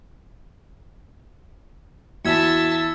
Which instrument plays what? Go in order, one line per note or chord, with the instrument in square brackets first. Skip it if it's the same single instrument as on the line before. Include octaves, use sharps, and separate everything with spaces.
[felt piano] E2 [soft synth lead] F#4 [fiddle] E5 A5 [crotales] E6 G#6 C#7